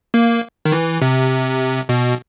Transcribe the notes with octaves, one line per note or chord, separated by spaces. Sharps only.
A#3
D#3
E3
C3
B2